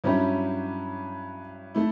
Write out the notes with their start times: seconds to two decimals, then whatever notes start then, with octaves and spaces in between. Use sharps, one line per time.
0.04 G2 F#3 C#4 E4 G4
1.75 A3 E4